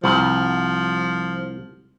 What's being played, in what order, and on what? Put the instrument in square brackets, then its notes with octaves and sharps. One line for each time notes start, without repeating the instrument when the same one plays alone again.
[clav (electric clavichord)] C2 [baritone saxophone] F3